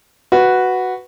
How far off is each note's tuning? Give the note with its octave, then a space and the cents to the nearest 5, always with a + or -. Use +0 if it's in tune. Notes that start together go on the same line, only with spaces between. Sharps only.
F#4 +0 B4 +0